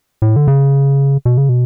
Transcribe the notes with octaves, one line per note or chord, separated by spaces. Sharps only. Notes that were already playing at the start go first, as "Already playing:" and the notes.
A2
D3
C#3
B2
C#3
B2